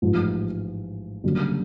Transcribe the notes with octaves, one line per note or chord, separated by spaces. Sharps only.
A1 G#2 F3 G#3
F#1 F#2 D3 G3